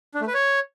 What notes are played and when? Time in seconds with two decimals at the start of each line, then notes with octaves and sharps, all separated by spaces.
0.14 D4
0.21 A3
0.27 B4
0.34 C#5